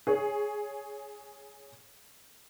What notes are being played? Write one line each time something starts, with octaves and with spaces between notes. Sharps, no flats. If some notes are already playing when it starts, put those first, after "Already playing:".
G#4 C#5